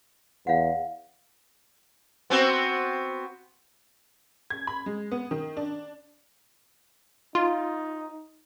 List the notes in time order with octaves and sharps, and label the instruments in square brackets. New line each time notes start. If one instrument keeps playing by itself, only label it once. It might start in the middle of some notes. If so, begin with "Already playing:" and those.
[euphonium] E2 [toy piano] F5 F#5
[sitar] B3 C4 F#4
[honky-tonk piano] G#6
B5
G#3
B3
D#3
D4
[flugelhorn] D#4 [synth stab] F4